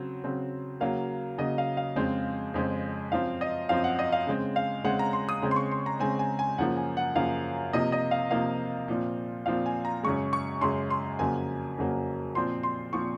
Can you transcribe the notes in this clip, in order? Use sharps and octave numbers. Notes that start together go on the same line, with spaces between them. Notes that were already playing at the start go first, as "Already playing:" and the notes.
Already playing: C#3 F#3 C4
C#3 F#3 C4
C#3 F#3 A#3 F5
C#3 F#3 A#3 D#5
F5
F5
F2 C#3 G#3 C4
F2 C#3 G#3 C4
F#2 F3 C4 F5
D#5
F#2 F3 C4 F5
F#5
D#5
F5
C#3 G#3 C4
F5
C#3 G#3 C4 F#5
A#5
C6
D#6
C#3 G#3 C4
C6
C#6
C6
A#5
C#3 G#3 C4 G#5
G#5
G#5
F#2 C#3 F3 A#3 F#5
G#5
F#5
F#2 C#3 F3 A#3 F5
C3 F3 A#3 D#5
D#5
F5
C3 F3 A#3 F5
A#2 F3 C4
A#2 F3 C4 F5
G#5
A#5
F#2 C#3 G#3 C#6
C#6
F#2 C#3 G#3 C6
C6
F2 C#3 F#3 A#3 G#5
F2 C#3 F#3 A#3
A#2 F3 C4 C6
C6
A#2 F3 C4 C#6